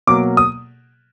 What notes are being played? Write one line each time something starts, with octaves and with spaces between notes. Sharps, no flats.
B2 F#3 A#3 D6
D#6